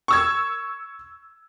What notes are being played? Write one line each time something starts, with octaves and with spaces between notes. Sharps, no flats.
C#6 E6 G#6